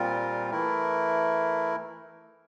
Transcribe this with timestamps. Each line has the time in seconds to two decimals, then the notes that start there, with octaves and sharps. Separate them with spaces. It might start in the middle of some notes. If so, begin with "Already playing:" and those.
Already playing: A#2 G3 C4 F4 A#4
0.51 E3 A3 E4 A#4